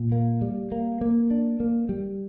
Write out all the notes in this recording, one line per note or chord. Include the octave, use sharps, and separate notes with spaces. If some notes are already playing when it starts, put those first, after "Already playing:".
Already playing: A#2
A#3
G3
A#3
A#3
D4
A#3
G3